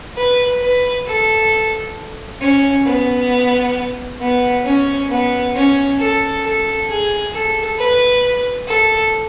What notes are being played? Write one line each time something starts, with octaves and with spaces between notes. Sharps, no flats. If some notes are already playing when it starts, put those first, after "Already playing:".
B4
B4
A4
C#4
B3
B3
C#4
B3
C#4
A4
A4
G#4
A4
B4
A4